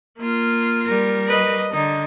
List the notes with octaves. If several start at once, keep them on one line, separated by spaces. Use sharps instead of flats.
A#3 F4
G3 A#4
B4 D#5
D3 D#4